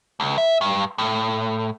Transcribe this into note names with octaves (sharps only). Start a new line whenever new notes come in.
C#2
E5
G2
A2